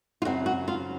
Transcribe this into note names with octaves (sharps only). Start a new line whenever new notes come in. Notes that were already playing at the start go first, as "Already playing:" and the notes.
F4
F#2 C#3 F#3 C4 F#4
F#4
F4